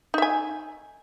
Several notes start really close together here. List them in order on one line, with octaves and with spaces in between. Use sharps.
D#4 E5 G#5